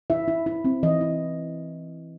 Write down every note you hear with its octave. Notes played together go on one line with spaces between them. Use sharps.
E4 E5
E4
E4
C4
E3 D#5
E4